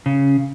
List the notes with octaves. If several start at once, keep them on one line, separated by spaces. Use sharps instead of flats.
C#3